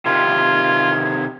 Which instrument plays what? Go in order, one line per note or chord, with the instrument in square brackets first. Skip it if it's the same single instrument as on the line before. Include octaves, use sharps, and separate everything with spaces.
[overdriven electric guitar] C3 D#3 [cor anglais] F4 [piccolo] G#6